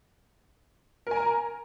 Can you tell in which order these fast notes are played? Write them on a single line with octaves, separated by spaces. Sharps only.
A#4 G#5 A#5